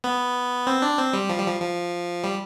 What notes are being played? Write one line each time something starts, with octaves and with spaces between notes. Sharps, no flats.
B3
C4
D4
C4
G3
F3
G3
F3
F3
G3